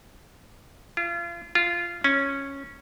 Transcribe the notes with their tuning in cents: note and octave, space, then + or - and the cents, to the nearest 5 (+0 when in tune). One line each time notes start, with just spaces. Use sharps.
F4 -35
F4 -15
C#4 -5